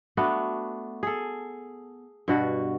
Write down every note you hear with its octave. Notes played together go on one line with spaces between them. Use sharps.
A3 B3 D4 F#4
G#4 A4
G2 B2 F#4